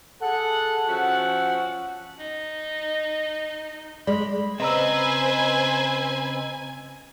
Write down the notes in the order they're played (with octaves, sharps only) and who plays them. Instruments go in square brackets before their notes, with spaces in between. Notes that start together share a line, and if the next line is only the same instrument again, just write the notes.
[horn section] G#4 A4 F#5
F3 C#4 F#4 E5 F#5
[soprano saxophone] D#4
[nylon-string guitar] G#3 [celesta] D5 [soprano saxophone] B5
[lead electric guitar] C#3 C4 [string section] B4 C5 [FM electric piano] D#5 A#5 E6 [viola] G#5